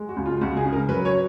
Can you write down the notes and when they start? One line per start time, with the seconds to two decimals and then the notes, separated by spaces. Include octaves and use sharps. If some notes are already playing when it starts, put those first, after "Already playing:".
Already playing: G#3
0.09 F#4
0.17 C#2
0.26 F4
0.41 C#2 F#4
0.57 G#4
0.65 C#3
0.72 A#4
0.89 F#3 B4
1.05 C#5